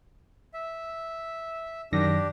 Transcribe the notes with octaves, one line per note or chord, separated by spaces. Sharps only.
E5
F#2 D#3 D4 G4 A#6